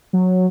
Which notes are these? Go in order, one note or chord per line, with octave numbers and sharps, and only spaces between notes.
F#3